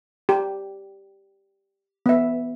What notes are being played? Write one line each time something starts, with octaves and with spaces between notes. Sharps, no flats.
G4
B3 E5